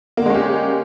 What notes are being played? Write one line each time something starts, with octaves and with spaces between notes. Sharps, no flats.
D3 G#3 A#3 C#4 G4